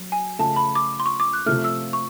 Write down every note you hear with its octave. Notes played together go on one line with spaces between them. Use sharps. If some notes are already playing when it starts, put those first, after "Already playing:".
Already playing: F#3
G#5
C#3 F3 A3 C#4 A5
B5
D6
C6
C#6
D6
F#6
C3 F3 A3 F6
E6
C#6